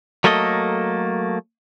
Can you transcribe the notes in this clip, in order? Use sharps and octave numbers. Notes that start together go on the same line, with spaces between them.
F#3 A3 A#3 A4 D#5